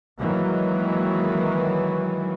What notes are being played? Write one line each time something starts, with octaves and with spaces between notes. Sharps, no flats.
D#3 E3 F#3 G#3 A#3